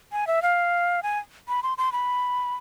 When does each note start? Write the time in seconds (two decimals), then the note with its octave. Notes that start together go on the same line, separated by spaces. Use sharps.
0.12 G#5
0.27 E5
0.42 F5
1.03 G#5
1.48 B5
1.63 C6
1.78 C6
1.92 B5